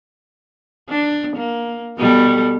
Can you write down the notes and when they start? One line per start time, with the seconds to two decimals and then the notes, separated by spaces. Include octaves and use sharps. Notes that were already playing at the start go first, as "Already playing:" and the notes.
0.90 D4
1.36 A#3
1.98 B2 G3 A4